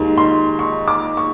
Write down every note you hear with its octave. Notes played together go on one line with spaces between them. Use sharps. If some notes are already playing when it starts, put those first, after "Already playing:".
Already playing: D#2 D#3 G#3
C6
C#6
D6
C#6